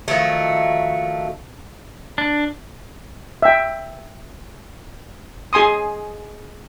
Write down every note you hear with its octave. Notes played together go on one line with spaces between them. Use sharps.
D#3 F3 F#3 A3
D4
E5 G5
G#4 G#5 C6 D#6